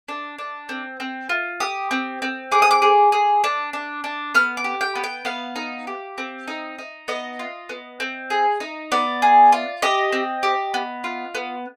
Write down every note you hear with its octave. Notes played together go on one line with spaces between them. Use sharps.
D4
D4
C4
C4
F4
G4 D#6
C4
C4
G#4 D6
D#6
D6
G#4
G#4
D4
D4
D4
B3 F6
D6
G4
G5
B3
G5
B3 F5
D#4
G4
C4
D#4
D#4
B3 D#5
F4
B3
C4
G#4
D#4
B3 D5
G#4
F4
G4 D#5
C4
G4
B3
F4
B3